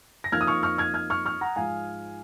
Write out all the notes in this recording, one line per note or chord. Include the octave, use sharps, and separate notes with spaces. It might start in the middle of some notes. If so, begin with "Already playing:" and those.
A#6
F2 F3 A#3 D#4 F6 G#6
D#6
C#6 F6
C#6 F6
F6 G#6
F6 G#6
C#6 F6
C#6 F6
F#5 A#5
G#2 F3 G#3 F5 G#5